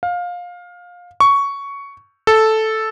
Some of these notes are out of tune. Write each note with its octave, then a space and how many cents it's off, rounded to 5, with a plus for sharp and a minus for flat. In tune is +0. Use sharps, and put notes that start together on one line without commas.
F5 +20
C#6 +10
A4 -5